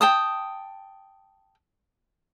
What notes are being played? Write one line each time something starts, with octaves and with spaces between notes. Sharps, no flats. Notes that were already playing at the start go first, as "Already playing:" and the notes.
G5 A5 D#6